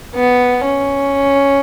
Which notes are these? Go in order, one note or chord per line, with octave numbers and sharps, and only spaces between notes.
B3
C#4